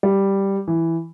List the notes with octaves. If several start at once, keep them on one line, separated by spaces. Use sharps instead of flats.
G3
E3